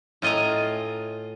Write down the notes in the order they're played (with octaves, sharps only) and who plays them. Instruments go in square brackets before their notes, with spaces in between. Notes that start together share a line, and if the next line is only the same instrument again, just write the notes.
[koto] A2 F4 D#5 G#5 A#5